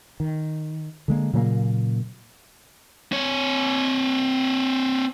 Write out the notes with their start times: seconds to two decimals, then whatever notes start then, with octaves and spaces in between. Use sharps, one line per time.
0.20 D#3
1.08 D3 G#3 A#3
1.33 A#2 C#3 F#3 A#3
3.12 C4 C#5